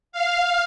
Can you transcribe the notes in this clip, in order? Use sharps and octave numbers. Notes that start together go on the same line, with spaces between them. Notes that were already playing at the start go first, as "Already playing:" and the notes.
F5